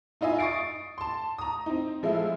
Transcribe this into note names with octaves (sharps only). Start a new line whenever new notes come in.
D#4 F4 D#5 E5 G#5
C#6 D#6 A6 C7 D7
A5 C6
A#5 D#6
C4 D#4
F3 G#3 A3 E4